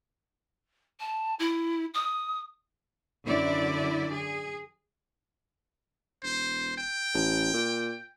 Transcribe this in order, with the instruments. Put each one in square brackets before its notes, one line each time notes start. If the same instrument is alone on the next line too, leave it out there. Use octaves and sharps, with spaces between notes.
[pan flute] A5
E4
D#6
[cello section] F#2 D3 E4 D5
G#4
[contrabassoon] E1 [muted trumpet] C5
[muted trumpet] G5
[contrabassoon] A1
A#2